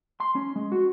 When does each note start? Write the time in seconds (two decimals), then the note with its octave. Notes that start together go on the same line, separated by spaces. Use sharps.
0.20 C6
0.35 C#4
0.56 G#3
0.72 F#4